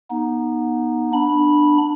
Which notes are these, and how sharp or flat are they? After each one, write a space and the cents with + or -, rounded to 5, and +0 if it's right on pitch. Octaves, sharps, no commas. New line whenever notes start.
B3 -25 D#4 +0
B3 +0 D4 +15 B5 -10